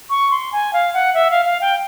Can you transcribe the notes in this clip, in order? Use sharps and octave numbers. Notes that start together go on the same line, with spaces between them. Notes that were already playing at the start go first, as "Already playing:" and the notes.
C#6
C6
G#5
F5
F#5
E5
F5
F5
G5